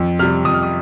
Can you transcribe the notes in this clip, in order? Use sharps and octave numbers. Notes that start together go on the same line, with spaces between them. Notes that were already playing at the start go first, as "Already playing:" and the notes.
Already playing: F2
C3 G3 F6
F2 D#6
F6
D#6